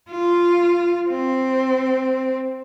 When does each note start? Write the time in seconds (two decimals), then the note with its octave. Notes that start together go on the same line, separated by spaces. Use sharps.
0.10 F4
1.09 C4